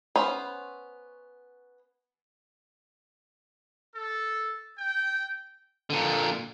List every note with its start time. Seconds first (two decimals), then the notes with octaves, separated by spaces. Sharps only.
0.16 B3 C#4 C5 B5
3.94 A4
4.78 G5
5.90 A#2 D3